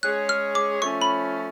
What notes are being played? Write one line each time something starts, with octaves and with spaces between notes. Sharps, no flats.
G#3 C#4 G#4 C#5 F#6
F6
D6
F3 A3 C#4 C#6
B5